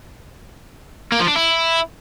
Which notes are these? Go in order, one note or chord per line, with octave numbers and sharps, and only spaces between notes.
A#3
F3
D4
E4